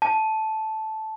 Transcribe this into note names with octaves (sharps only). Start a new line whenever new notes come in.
A5